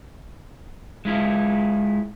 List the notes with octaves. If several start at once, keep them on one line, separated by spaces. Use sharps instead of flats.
G#3 E4 F4